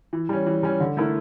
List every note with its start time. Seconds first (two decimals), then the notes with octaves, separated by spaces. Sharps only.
0.13 E3
0.29 G3 C#4
0.46 E3
0.63 G3 C#4
0.80 D3
0.97 A3 E4 A#4